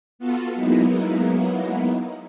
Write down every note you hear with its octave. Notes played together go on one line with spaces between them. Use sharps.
B3 F4 F#4 A4
F#3 G#3 A#3 B3 D#4 E4